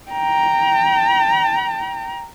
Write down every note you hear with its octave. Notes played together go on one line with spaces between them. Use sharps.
G5 A#5